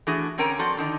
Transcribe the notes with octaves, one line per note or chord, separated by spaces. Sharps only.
E3 A3 D4 F#4 G#4
D3 C4 C#4 A#4 G5 A#5
F3 C4 F#4 A4 D5
D3 D#3 D4 D#4